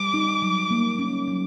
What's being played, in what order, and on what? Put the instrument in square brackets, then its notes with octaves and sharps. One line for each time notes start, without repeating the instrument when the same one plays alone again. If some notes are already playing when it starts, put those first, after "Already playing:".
Already playing: [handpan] G3 [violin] D6
[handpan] D#4
F#3
A#3
C#4
F#3